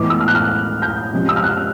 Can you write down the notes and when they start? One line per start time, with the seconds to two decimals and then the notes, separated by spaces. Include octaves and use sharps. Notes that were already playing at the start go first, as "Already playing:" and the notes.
Already playing: A2 E3 G#3 B3 D6
0.10 E6
0.20 F6
0.28 F#6
0.35 F6
0.82 G6
1.13 C3 F3 G#3 C#4
1.29 E6
1.36 F6
1.44 F#6